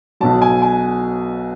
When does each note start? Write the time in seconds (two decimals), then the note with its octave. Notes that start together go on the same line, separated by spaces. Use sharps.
0.20 B1 B2 F#3 A5
0.42 G#5
0.62 G#5